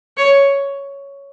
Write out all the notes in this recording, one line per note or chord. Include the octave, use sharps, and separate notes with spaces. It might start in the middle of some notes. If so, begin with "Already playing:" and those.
C#5